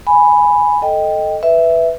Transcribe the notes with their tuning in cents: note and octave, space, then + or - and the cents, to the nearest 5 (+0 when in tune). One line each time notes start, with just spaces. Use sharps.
G#5 +0 B5 +0
A4 +0 D#5 +0 G5 +5
B4 +5 E5 +0